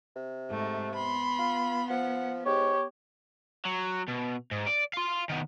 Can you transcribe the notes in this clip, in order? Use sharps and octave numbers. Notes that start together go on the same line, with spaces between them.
C3
G#2 A3
B3 B5 C6
F4
F3 F#5
G#2 G4 C#5
F#3
B2
G#2
D5
F5 C6
D#3 B3